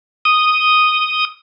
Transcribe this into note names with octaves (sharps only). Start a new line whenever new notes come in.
D#6